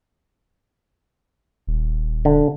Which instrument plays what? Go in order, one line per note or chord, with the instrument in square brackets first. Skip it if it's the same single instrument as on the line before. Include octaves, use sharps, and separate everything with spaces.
[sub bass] D#1
[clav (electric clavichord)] D3